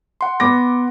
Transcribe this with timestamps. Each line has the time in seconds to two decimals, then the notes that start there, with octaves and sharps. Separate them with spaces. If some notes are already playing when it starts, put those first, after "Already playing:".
0.21 F#5 C6
0.40 B3 D6 A#6